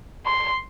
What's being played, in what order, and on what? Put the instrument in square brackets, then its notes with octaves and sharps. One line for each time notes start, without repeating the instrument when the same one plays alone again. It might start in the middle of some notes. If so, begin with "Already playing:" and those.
[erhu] C6